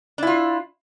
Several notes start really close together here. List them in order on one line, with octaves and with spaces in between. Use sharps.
D4 E4 F4